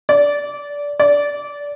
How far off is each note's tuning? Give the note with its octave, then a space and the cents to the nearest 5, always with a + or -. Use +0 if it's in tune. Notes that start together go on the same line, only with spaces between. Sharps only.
D5 -20
D5 -20